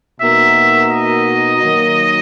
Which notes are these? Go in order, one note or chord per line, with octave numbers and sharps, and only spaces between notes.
B2 A#3 D#4 F#4 A#4 E5
D#5
D#3 F#3 A#3